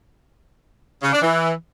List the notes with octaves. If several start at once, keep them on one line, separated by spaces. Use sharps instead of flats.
C#3
D4
E3